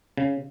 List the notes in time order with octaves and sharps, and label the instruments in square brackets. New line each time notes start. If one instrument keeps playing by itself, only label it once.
[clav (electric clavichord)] C#3